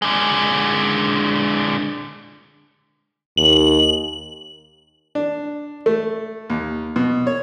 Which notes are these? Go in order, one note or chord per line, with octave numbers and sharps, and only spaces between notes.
D3 G#3
D#2 F#7
D4
A3
D#2
B2
C#5